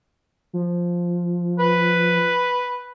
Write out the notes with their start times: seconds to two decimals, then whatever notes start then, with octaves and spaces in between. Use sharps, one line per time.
0.53 F3
1.59 B4